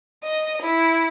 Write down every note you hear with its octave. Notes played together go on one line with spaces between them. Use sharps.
D#5
E4